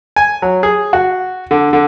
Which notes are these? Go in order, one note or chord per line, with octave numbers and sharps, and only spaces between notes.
G#5
F#3
G#4
F#4
D3
D3